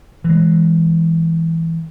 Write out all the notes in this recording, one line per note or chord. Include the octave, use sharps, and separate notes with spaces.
E3 G#3